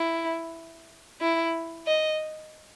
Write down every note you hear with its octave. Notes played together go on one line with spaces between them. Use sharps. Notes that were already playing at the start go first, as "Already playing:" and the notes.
Already playing: E4
E4
D#5